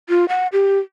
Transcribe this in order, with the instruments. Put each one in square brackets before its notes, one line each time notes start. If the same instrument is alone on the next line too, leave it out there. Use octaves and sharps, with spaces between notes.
[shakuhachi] F4
F#5
G4